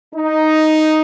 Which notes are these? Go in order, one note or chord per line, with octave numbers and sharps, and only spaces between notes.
D#4